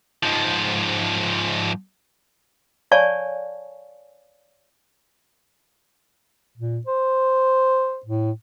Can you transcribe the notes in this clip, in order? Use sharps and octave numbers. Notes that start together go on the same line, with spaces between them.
G#2 F3
C#5 D5 F5 G#5 A5 C#6
A#2
C5
A2